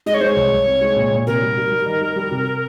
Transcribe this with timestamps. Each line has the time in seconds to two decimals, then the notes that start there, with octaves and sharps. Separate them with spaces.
0.06 G#3 D#5
0.14 C#5
0.21 G#3 C5
0.28 C#5
0.36 C2
0.52 C2
0.67 C4
0.81 G#3
0.96 A#2
1.11 A#2
1.27 C3 A#4
1.42 G3
1.57 G3
1.71 G3
1.86 D#3
2.01 G3
2.16 G3
2.31 C3